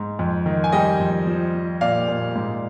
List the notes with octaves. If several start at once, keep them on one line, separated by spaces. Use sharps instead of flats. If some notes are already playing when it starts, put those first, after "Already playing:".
Already playing: G#2
F2
D#3
G#5
G3 D#5 G5
F2
F3
F3
A#2 D5 F5
A#2
G#2